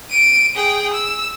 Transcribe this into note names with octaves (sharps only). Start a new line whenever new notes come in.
D7 D#7
G#4 G5
E6